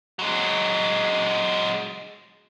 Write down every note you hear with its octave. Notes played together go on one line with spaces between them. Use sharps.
F#3 G#3